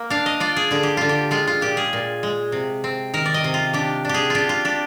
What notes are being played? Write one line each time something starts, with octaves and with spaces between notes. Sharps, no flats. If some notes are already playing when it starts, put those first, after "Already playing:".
Already playing: A#3
D4 F5
D#5
F4 D5
G#4
D3 G#4
G4
D3 F4
G4
G#3 F4
F4
A#2 G4
G#4
A#2
G#3
C3
C4
D#3 A#4
D5
D#5
C3
F4
D4 G4
D4 G4
G#4
D4 F4 G4
F4
D4 G4